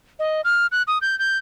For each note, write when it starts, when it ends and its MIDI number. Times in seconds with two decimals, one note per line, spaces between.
0.19 0.41 75
0.44 0.67 89
0.72 0.82 90
0.87 0.98 87
1.02 1.18 91
1.19 1.38 91